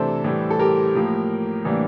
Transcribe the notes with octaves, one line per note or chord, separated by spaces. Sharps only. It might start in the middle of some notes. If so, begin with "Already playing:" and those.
Already playing: C3 E3 A3 D4 A4 C5 E5
A2 E3 G3
A4
G4 A#4
A2 F3 A#3
A2 E3 G3 A#3 D4